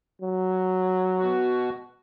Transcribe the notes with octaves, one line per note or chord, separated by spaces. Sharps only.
F#3
B2 F#4